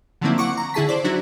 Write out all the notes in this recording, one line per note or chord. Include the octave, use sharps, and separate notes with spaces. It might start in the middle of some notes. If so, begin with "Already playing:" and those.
D3 F3 F#3 A#3 C4 E4
F#5 C#6 D6
A#5
D3 E4 G#4 A5 B6
C5 D5
F#3 D4 E4 F#4